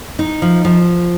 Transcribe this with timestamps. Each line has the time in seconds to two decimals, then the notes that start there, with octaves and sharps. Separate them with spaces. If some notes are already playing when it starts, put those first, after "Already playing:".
0.19 D#4
0.42 F3
0.65 F3